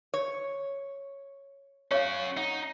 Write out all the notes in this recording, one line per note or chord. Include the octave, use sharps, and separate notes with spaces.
C#5
C#4 F#4 C#5 F5
D#4 F#5